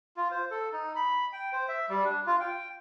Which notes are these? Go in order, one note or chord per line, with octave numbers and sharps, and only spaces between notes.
F4
C5
A4
D#4
B5
G5
C5
E5
G3
D4
F4
G5